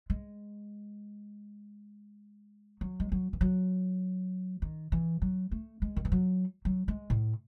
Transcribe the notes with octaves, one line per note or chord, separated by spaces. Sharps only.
G#3
F#3
G#3
F#3
E3
F#3
D#3
E3
F#3
A3
G#3
D#3
E3
F#3
F#3
G#3
A2